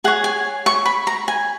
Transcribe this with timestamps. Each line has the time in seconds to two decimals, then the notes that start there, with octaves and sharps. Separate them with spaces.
0.04 G#4 F#5
0.08 C#5
0.24 G#5
0.66 C#6
0.86 B5
1.07 A#5
1.28 G#5